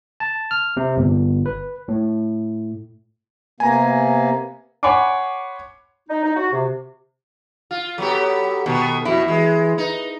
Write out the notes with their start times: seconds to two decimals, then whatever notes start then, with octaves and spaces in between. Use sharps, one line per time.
0.20 A5
0.51 F6
0.77 C3
0.97 G1
1.46 B4
1.88 A2
3.60 C3 A#3 B3 G#5 A#5
4.83 C#5 F#5 G#5 B5 C6 D6
6.09 D#4
6.24 D#4
6.36 F#4
6.52 C3
7.71 F4
7.98 F#3 B3 G4 A4
8.66 B2 D#3 B3 A4
9.05 F2 B2 E4 F#4
9.28 E3 G#3
9.78 D#4 B4